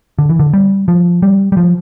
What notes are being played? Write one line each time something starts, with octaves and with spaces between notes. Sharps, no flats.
D3
E3
D3
G3
F3
G3
G3
F3